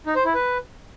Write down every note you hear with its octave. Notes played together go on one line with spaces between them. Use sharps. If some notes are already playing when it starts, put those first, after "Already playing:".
D#4
C5
E4
B4